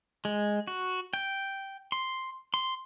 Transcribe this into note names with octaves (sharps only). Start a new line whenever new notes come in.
G#3
F#4
G5
C6
C6